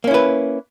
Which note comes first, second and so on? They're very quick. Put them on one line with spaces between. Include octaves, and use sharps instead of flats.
A#3 C#4 E4 B4